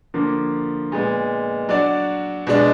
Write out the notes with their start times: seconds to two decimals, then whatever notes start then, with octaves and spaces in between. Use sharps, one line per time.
0.14 D3 F3 A#3
0.92 A#2 G#3 B3
1.69 F#3 D4 F#4 D5
2.47 B2 G#3 D4